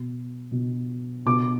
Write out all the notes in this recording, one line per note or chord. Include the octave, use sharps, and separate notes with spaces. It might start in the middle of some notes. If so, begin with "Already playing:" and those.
Already playing: B2
B2
B2 D6